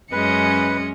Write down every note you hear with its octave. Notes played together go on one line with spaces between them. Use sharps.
F#2 G#3 C#4 B4 D#5 C#7